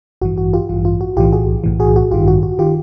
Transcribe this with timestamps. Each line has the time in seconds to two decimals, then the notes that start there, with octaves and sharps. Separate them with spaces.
0.21 A1 G2 E3 F#4
0.38 F#4
0.53 F4 G4
0.69 A1 G2 E3 F4
0.85 F4
1.01 F#4
1.17 B1 A2 E3 F4 G4
1.33 F#4 G#4
1.64 B1 A2 E3
1.80 F#4 G#4
1.96 F#4
2.11 A1 G2 D#3 F4 G4
2.28 F#4
2.43 F#4
2.59 D#3 F4 G4